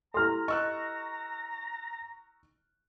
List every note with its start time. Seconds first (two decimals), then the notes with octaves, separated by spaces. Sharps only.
0.14 E4 G4 A4 A#5 C6 F6
0.48 D#5 C#6 E6 F#6